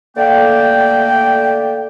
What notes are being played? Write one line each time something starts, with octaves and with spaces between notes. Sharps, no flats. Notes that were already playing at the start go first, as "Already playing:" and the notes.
D3 A3 A#3 D5 G5